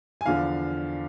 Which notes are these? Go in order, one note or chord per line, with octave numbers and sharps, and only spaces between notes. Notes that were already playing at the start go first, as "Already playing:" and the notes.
G#5
E2 D3 F3 F5